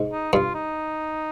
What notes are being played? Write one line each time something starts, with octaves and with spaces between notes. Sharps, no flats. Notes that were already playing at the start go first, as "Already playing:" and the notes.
Already playing: G#2
D#4
G2 F4
D#4